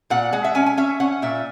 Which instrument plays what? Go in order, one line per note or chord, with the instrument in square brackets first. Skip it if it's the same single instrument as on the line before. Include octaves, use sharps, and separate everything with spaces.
[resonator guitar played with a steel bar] A#2 F#5
G#3 F#5
E5
C#4 G#5
G#5
C#4 E5
C#4 F#5
A#2 E5